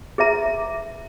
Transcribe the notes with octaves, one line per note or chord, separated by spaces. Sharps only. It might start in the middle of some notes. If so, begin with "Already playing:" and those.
G#4 B4 E5 A#5